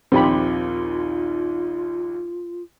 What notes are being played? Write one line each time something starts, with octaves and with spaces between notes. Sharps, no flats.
A#1 D#2 C4 F4 G4 B5